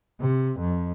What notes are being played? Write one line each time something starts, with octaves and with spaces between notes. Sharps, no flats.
C3
F2